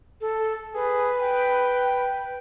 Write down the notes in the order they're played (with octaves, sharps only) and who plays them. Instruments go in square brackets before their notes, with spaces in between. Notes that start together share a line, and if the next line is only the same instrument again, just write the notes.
[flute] A4
[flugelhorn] G#4 [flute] B4
[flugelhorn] G5